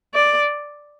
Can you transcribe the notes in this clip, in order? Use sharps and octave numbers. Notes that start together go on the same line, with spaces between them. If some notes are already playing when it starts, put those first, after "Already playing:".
D5